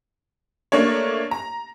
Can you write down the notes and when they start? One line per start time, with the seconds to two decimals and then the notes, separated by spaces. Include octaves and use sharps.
0.72 A3 A#3 D4 C#5
1.31 A#5